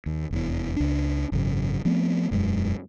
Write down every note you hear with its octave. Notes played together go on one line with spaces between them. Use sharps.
D#2
F1 E2 E3
C#2 D4
G#1 F#2 C#3
F3 A3 B3 C4
E1 F#2 G#3